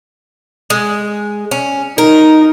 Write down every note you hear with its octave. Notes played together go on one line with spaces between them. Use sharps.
G#3
C#4
D#4 A#4